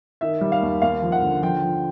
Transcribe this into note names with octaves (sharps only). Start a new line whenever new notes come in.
D#3 E5
G3
F5
D#2
D#2 F5
F3
F#5
D3
F3 G5
F3